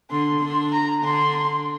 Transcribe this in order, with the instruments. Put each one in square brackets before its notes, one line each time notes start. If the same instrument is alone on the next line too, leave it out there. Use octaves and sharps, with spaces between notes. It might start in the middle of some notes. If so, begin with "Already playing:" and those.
[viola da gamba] D3 D4 [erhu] C6
[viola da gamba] D3 D4
[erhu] A#5
[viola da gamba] D3 D4 [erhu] C6